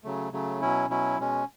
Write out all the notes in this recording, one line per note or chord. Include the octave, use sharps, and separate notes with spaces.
C#3 F#3 A3
C#3 F#3 A3
B2 F#3 C#4 E4
B2 F#3 C#4 E4
B2 G#3 C#4